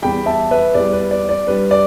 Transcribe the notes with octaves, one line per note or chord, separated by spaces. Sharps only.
E2 E3 G3 G5 B5
E5 A5
B4 E5
E2 E3 G3 D5
B4
D5
D5
G2 G3 B4
D5